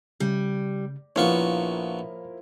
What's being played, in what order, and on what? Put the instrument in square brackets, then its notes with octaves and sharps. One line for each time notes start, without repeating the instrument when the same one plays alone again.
[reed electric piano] C#3 [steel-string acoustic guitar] G3
[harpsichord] A#1 B3 C#6 [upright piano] F3 E4 [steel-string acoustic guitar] A#3 [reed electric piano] C#5 F5